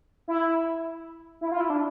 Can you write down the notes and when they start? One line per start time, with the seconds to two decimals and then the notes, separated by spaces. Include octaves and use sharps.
0.28 E4
1.41 E4
1.52 F4
1.61 E4
1.70 D4